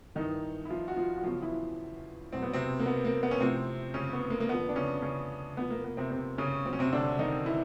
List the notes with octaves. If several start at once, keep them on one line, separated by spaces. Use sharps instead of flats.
G2 D#3 E3 D#4
E4
F3 F4
F#4
F3 F4
F#4
E2 C#3 F3 F#3 F4
E3 E4
E2 B2 F#3 C4
B3
C3 C4
A#3
B3
A#3
B3
C#4
A2 C3 F3 C4
C#3 C#4
B3
A#3
A#3
F2 D3 F3 B3
D4
C#3 C#4
C#3 C#4
E2 C3 F3 B3
A#3
B3
C3 C4
C3 C4
C#3 C#4
A#2 F#3 C4 C#4
C3 C4
D3 D4
D#3 D#4
E3 E4